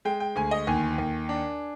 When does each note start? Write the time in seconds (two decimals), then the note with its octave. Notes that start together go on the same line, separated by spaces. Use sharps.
0.05 G#3 G5
0.20 G5
0.36 D2 G#5
0.51 D#5
0.67 D#2 G#5
0.98 D#2
1.29 D4